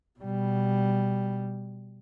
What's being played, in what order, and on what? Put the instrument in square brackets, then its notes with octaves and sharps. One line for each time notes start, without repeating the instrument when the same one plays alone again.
[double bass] B2 G3